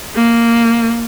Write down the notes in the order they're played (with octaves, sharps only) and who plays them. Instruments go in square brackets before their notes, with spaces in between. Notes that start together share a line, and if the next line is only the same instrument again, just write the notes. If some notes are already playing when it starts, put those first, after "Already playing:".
[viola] A#3